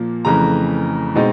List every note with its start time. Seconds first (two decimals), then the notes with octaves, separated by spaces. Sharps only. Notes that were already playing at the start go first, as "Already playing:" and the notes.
Already playing: A#2 F3 A#3
0.25 F2 C#3 E3 A3 A#5
1.15 B2 G#3 C4 D#4